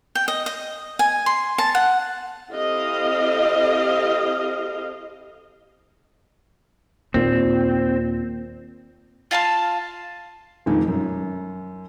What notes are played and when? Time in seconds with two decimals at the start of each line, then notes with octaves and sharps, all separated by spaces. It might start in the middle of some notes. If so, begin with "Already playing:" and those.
0.15 G5
0.28 D#5
0.46 D#5
0.99 G#5
1.26 C6
1.58 A5
1.75 F#5
2.51 C4 E4 G4 A4 D#5 F5
7.14 D#2 A#2 C4
9.31 F4 F5 A5 C6
10.66 F1 F2 D#3
10.88 F#2